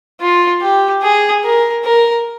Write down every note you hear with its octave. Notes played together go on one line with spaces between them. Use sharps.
F4
G4
G#4
A#4
A#4